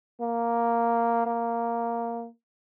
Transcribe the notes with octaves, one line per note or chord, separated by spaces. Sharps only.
A#3
A#3